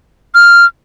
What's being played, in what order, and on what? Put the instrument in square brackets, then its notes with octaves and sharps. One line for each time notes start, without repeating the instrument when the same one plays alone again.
[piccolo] F6